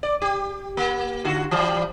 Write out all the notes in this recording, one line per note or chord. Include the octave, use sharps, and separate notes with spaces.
D5
G4
A#3
D3 F4 F#4
E3 F3 G3